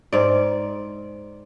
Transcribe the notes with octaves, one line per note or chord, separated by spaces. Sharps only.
G#2 D5